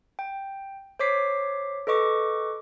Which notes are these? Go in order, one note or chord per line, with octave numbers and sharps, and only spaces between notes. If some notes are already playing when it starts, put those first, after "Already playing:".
G5
C5 C#5 D6 B6 C7
A4 B4 D#5 C#6 D6